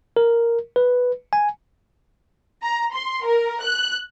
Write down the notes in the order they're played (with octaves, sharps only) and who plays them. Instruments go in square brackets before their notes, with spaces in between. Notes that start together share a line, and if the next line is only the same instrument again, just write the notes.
[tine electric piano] A#4
B4
G#5
[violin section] A#5
C6
A#4
F#6